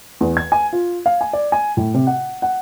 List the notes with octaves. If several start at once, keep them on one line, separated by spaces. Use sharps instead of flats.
E2
G#6
G#5
F4
F5
G#5
D5
G#5
A2
C3
F#5
F#5